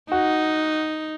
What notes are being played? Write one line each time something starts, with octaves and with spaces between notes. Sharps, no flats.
D#4 F#4